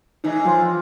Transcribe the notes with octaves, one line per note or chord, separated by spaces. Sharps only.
A2 E3 G#3 D#4
F3 F4 C5